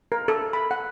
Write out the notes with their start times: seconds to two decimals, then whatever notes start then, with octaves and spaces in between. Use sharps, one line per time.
0.12 A#4
0.28 A4
0.53 B5
0.71 F#5